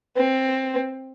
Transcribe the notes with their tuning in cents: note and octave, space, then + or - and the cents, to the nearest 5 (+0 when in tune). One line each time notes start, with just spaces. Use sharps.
C4 +10